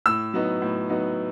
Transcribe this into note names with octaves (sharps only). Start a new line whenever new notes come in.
A2 E6
F#3 B3 D#4
A2
F#3 B3 D#4